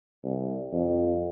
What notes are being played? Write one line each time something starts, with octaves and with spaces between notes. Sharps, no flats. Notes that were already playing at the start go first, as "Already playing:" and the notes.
C2
F2